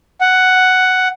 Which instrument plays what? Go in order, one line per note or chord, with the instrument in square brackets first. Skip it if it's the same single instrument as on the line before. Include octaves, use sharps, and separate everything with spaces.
[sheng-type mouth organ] F#5